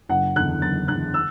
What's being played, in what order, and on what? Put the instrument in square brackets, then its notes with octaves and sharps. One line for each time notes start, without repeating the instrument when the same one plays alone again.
[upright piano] F#1 F#5
E2 D3 F#6
F#1 A6
E2 D3 F#6
E6